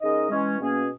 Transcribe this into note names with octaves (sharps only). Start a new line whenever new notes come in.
C#3 G#3 D#4 A#4 D#5
E3 G#3 C#4
B2 A#3 C#4 G#4